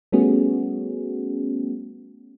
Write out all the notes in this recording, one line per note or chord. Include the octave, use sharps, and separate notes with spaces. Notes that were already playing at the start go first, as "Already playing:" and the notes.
G3 A3 B3 C#4 F#4 G#4